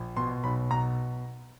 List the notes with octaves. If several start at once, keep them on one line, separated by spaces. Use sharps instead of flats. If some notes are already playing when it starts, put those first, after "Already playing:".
Already playing: A#1
B2 C6
B1 B5
B2 A#5